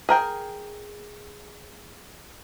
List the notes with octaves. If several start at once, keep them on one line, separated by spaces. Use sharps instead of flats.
G#4 A#4 G5